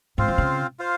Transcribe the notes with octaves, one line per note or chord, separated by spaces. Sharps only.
G#2 C4 F4 C5 F5
E3
C#3
F4 C5 F5